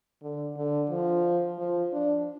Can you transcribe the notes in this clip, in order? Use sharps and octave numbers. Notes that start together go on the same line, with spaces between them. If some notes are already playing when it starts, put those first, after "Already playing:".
D3
D3
F3
F3
D4